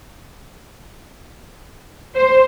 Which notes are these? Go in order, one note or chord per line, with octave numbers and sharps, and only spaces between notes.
C5